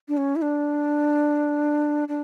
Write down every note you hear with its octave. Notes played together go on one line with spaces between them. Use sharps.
D4
C#4
E4
D4
D4